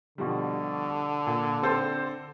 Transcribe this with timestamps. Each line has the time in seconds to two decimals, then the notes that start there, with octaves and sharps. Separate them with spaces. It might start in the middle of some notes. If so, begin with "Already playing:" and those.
0.18 B2 D3 F3 G3
1.27 A#2
1.63 C4 A4 C5